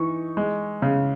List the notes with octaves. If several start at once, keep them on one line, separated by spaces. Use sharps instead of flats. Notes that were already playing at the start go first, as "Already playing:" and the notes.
Already playing: E3 D#4 C#6
G#3
C#3